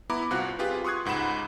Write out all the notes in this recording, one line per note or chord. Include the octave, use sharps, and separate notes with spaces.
B3 E4 A#5 B5 D6
C2 C4 F4 F#4 F#6
F4 G4 G#4 B4
C6 C#6 D#6 F#6 G#6
C#2 G#2 F#5 B5 E7